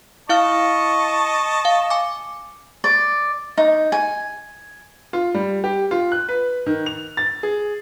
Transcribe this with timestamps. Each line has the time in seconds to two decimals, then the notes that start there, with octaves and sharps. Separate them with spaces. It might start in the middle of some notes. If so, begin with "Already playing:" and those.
0.29 E4 D#5 F5 A5 C#6 F6
1.65 F5
1.90 G#5 D6
2.84 D5
3.57 D#4
3.92 G#5
5.13 F4
5.34 G3
5.64 G4
5.91 F4
6.12 F#6
6.29 B4
6.66 D#3
6.86 F7
7.17 A6
7.43 G#4